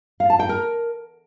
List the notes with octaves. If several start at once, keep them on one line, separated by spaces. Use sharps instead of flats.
F5
A5
G5
A#4